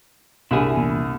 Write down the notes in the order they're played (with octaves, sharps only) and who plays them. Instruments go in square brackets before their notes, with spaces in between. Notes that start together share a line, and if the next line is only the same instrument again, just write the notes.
[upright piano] C2 G2 [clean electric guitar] E4 G#4
[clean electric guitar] E2 A#2